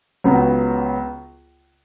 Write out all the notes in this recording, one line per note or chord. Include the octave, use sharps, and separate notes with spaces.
C#2 C#3 F#3 B3